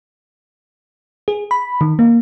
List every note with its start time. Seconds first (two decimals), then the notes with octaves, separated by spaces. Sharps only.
1.28 G#4
1.51 B5
1.81 D#3
1.99 A#3